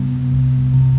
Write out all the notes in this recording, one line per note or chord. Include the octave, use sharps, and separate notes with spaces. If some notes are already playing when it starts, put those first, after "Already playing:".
Already playing: C3 G3 B3
C2
C3